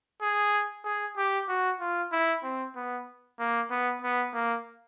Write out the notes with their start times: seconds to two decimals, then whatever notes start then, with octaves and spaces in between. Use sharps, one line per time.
0.22 G#4
0.85 G#4
1.17 G4
1.49 F#4
1.80 F4
2.12 E4
2.43 C4
2.76 B3
3.39 A#3
3.71 B3
4.02 B3
4.34 A#3